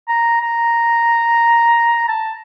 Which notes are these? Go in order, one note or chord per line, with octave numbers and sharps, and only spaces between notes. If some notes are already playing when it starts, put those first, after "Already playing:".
A#5
A#5
A5